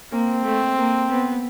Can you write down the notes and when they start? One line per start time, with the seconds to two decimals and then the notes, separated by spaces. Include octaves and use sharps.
0.12 A#3 C4
0.45 A3
0.78 A#3
1.10 B3